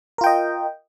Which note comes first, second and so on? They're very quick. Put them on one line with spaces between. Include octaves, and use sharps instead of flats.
A#4 F4 G5 D#5